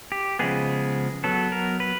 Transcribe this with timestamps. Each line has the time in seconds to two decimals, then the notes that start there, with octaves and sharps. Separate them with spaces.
0.12 G4
0.39 C#3 F3 G#3 B3 G#4
1.24 F#3 B3 A4
1.52 A#4
1.80 B4